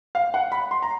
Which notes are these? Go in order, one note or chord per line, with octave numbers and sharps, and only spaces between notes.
F5
F#5
B5
C6
A#5